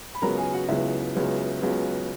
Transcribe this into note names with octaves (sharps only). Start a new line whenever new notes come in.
B5
C#2 C#3 F#3 B3 A#4 A#5
G#4 G#5
F#4 F#5
C#2 C#3 F#3 B3 E4 E5
C#2 C#3 F#3 B3
C#2 C#3 F#3 B3